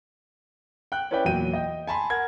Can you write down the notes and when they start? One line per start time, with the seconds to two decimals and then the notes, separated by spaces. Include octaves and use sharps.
0.92 G5 F#6
1.11 C#4 E4 B4 D5 G5
1.25 E2 A#2 F#3 G5 D#7
1.53 D#5 G5
1.87 G#5 A5 B5 C6
2.10 A#4 F#5 G#6